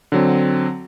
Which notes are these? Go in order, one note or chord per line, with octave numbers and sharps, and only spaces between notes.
D3 F#3 C4